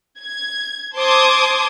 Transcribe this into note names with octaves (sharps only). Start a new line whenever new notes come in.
G#6
C5 A5 C6 D6 D#6 G#6